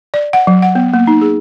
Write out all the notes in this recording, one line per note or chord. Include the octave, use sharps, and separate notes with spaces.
D5
F#5
F#3
F#5
B3
A#3
D#4
G#4